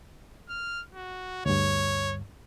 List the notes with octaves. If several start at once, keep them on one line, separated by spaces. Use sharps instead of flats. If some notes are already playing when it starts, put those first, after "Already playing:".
F6
F#4
D2 G2 C#5